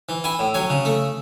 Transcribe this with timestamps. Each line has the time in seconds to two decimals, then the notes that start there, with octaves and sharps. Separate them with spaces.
0.09 E3
0.24 E4 G#5
0.39 A2
0.54 F#3 G#5
0.70 C#3
0.85 A3